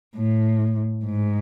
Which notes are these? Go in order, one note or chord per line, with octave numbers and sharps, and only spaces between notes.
A2
G#2